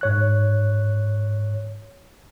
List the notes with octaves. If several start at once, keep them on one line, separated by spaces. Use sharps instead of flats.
G#2 C#5 F#6